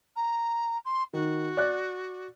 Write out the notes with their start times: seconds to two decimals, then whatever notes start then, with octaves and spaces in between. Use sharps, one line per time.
0.16 A#5
0.85 C6
1.13 D#3 F#4
1.57 D5 F#6